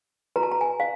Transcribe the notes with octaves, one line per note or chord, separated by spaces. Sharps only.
F#4 B4 A#5
A5
A#5
G#5
F5